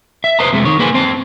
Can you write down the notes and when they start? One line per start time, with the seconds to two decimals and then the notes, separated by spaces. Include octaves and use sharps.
0.24 E5
0.39 B4 C5 D#5 A5 A#5
0.53 F2 C3 G#3 A3
0.65 D#3 C#5
0.79 A#3 G#4 B4 C5 F#5 G#5
0.94 C4 C5 A5